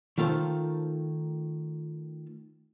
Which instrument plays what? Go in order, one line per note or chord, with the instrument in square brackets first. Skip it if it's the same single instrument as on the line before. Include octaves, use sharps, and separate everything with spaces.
[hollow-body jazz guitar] D#3 A3 F4 A4 C5